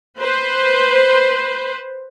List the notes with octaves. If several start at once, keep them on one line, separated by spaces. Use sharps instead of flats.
B4 C5